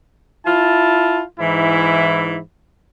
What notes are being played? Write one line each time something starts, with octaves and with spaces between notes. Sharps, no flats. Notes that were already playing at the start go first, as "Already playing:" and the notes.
E4 F4 A5
G#2 E3 E4